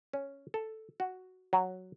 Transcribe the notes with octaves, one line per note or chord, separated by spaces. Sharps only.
C#4
A4
F#4
F#3